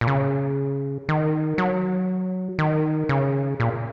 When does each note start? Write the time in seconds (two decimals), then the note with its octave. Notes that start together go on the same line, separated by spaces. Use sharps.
0.01 A#2
0.07 C#3
1.09 D#3
1.58 F#3
2.59 D#3
3.09 C#3
3.60 A#2